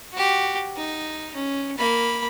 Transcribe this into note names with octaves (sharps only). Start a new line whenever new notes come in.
F#4 G4
D#4
C#4
A#3 B5